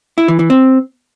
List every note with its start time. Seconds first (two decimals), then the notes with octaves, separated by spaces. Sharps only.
0.18 E4
0.28 E3
0.39 E3
0.50 C4